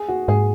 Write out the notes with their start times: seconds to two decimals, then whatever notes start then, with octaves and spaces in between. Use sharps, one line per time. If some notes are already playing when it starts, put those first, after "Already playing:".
Already playing: G#4
0.08 F#4
0.28 G#2 G#4